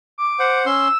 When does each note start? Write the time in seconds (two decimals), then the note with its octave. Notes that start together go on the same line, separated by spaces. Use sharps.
0.18 D6
0.39 C5 F#5
0.66 C#4 C6 E6